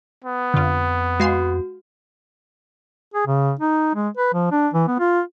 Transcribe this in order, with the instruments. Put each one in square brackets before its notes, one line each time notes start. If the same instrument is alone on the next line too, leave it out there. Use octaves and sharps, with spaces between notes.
[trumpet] B3
[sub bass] F2 [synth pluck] D3 F4
[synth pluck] G#3 F5 C6 [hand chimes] F#4
[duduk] G#4
C#3
D#4
G#3
B4
F3
D4
E3
B3
F4